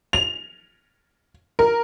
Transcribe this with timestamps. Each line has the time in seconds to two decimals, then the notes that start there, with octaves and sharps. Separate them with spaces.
0.13 F7
1.59 A#4